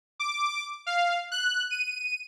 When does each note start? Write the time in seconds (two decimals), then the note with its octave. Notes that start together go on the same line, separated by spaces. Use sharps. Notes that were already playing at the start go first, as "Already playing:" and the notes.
0.20 D6
0.86 F5
1.32 F#6
1.71 D#7